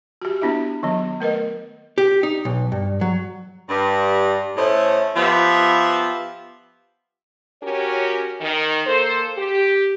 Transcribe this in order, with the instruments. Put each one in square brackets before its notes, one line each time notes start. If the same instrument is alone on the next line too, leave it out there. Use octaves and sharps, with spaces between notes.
[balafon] F#4 G4
B3 D4 E4 E5
D#3 F#3 B3
A3 A#4 B4 D#5
[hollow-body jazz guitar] G4
D#4
B1
G2
F#3
[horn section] G2
A2 A3 C#4 C5 D#5
F3 B3 G4 E5
[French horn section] C#4 F#4 G4 A#4 C#5
D#3
A#3 A4 C5
G4